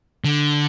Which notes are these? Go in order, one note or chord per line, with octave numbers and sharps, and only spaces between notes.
D3